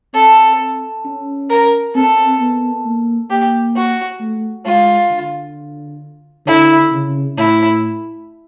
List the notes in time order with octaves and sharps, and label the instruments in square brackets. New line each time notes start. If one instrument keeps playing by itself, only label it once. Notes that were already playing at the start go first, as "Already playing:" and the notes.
[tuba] C4 [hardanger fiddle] A4
[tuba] C#4
[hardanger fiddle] A#4
[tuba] C4 [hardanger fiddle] A4
[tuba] B3
A#3
[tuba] A#3 [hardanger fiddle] G4
[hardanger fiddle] F#4
[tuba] A3
[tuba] G#3 [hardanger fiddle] F4
[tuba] D3
[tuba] D3 [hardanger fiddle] E4
[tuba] C#3
[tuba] A2 [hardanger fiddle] E4